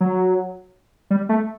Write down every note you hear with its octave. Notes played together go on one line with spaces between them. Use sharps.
F#3
G3
A3